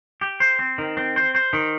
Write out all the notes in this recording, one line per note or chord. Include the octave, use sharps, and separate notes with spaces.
G4
C5
C4
D#3
C4
C5
C5
D#3